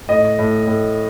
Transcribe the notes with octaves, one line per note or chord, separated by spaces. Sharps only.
A2 D#5
A2
A2